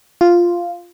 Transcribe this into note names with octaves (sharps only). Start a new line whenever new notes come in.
F4